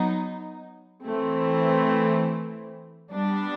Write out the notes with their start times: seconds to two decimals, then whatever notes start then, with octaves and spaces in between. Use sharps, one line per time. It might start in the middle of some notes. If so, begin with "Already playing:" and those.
Already playing: F#3 B3 D#4
1.05 E3 A3 C4
3.11 G3 B3 D4